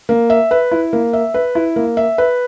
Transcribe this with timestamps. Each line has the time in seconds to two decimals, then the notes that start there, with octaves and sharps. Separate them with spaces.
0.09 A#3
0.30 E5
0.51 B4
0.71 E4
0.93 A#3
1.13 E5
1.34 B4
1.55 E4
1.76 A#3
1.97 E5
2.18 B4